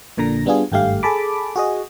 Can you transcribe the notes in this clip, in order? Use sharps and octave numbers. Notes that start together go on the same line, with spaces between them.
A#1 A#2 D3 A#5 A#6
G3 B3 D4 F4 G#4
G#1 G2 A3 G4 F5
G#4 A4 A5 B5 D6
F#4 G#4 D#5